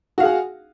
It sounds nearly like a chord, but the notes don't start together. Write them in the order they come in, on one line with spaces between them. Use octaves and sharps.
F#4 F5 G#4 F#5